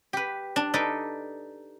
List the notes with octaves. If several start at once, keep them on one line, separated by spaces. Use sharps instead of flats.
G4 B4
D4
D#4 A4 B4 D5